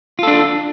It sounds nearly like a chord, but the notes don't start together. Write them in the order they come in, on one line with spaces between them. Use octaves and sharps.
F4 A4 D4